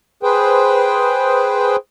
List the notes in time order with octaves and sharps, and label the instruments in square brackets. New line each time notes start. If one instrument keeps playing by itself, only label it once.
[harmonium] G#4 B4 C5 G5